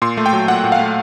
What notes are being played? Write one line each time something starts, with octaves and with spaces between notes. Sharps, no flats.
A#2 C6
A3
G5
F#3
A#2 F#5
A#2
F5
A3